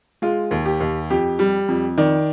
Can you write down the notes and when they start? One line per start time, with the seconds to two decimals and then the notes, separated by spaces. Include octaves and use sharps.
0.22 G#3 F4
0.51 D#2
0.65 G4
0.80 D#2
1.10 F2 G4
1.39 G3
1.68 F2
1.98 D#3 D5